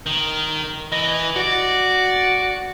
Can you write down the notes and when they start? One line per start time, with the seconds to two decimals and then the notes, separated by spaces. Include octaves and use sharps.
0.06 D#3
0.92 E3 D#5
1.36 F#4 D5